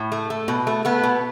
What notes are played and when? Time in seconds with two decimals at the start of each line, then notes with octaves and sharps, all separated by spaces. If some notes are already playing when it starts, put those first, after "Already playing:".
Already playing: A2
0.12 A3
0.30 A3
0.48 B2
0.67 A3
0.85 A3 B3
1.03 B2